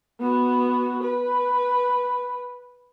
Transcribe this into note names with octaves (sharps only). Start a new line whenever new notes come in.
B3 F#4
B4